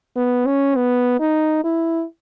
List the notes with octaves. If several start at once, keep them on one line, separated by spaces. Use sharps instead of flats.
B3
C#4
B3
D#4
E4